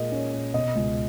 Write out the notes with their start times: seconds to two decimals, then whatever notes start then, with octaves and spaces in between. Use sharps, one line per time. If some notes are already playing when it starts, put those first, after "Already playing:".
Already playing: A#2 G#3 D#5
0.12 C#4
0.34 A#2
0.54 B2 D#5
0.75 C#2